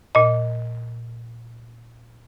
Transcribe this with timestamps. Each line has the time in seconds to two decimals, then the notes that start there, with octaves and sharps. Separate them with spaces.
0.15 A#2 D#5